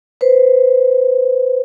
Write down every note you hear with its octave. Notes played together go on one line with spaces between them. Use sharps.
B4 C5